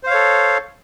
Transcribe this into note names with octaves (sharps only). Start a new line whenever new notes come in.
A4 C5 C#5 F5